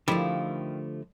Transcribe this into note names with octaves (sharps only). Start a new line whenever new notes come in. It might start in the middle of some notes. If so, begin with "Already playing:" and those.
D3 D#3 F3 G3 A3 E4 F4